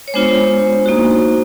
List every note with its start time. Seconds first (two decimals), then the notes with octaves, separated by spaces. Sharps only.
0.08 C#5
0.14 G#3 B3 D4 F4 C5
0.86 A#3 D#4 F#4